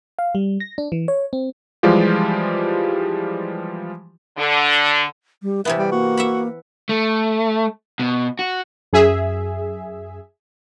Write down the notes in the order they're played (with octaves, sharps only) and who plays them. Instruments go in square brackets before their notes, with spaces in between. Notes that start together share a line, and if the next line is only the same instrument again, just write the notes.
[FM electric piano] F5
G3
A#6
D4
E3
C#5
C4
[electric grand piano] E3 F3 G3 G#3 F4 G4
[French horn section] D3
[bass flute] G3
[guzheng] C3 E3 B3 [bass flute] E5
[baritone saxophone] G3
[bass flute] A#3 [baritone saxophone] F#4
[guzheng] E5 F#5 B5
[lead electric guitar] A3
B2
F#4
[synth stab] F#2 G#4 E5